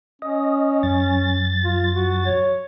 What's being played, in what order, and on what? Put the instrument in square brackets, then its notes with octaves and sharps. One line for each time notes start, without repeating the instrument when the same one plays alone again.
[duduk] C#4 [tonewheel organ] D#5
[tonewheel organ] F#2 A6
[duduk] F4
F#4
C#5